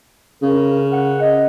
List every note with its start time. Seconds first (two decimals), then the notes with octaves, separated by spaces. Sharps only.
0.42 C#3 A#4
0.92 F#5
1.21 D#5